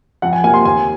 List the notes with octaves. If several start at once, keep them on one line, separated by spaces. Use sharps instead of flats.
F2 F#5
G#5
C3 F3 A#3 G#5
C6
D#2 G#5